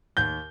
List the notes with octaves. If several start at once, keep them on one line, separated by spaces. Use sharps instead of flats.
D#2 G6